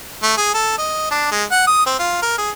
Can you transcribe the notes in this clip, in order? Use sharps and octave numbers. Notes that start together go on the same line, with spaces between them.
A3
G#4
A4
D#5
D4
G#3
F#5
D#6
C4
F4
A#4
G#4